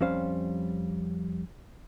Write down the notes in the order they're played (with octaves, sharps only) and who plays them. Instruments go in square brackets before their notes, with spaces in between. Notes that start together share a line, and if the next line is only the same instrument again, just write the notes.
[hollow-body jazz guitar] F2 G3 C#4 C5 F5